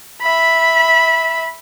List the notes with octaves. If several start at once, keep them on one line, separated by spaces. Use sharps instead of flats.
E5 B5